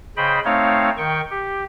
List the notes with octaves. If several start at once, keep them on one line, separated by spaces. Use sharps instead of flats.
C#3 C5 D#5 G5 B5
A3 C4 D#4 C#5 F5
D#3 G5 C#6
G4